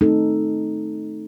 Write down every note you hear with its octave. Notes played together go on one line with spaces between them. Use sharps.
A3 C4 D#4 A4